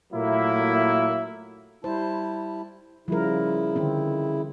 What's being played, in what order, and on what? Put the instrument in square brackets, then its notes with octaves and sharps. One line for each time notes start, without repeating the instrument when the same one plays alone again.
[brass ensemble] A#2 F#3 A3 A#3 E4
[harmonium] G3 E4 A5 [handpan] C5
[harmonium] C#3 E4 [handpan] F3 G3 A#4
[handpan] D3 D#3 C4